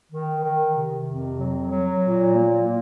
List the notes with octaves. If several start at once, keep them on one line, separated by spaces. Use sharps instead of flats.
D#3
D#3
C3
F2
F#3
F#3
A#2
A#3
A#2